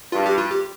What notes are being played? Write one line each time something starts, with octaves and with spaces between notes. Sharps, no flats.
G2 F4
G4
F4
G4